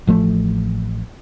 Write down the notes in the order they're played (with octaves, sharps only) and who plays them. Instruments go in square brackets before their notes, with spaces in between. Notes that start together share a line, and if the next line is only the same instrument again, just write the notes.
[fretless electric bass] A1 F3 A3